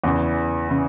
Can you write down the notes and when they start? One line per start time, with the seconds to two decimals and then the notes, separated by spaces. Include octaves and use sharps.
0.04 E2 C#3 E3
0.69 C#3 E3